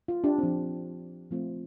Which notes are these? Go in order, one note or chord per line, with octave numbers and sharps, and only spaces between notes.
F4
D4 G4
F3 C4
F3 A3 C4 F4